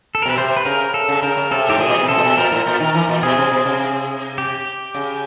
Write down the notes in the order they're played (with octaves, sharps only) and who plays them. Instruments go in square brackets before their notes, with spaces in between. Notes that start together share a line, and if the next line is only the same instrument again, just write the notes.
[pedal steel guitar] A4
A#4
[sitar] B2 [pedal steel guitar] B4
[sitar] C3 [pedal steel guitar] C5
[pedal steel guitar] B4
[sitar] C#3 [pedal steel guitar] A#4
[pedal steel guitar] A4
[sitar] C#3
[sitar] C#3 [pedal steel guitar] A#4
[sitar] C#3
[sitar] C3 [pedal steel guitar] A4
[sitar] G#2 [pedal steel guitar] G4
[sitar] A2 [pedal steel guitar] G#4
[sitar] A#2
B2
[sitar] C3 [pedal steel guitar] A4
[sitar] A#2
B2
[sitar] A#2 [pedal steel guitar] A#4
[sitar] A2
A#2
D#3
E3
A#2
[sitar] B2 [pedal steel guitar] G#4
[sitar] C3
B2
C3
[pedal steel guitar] G4
[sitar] C#3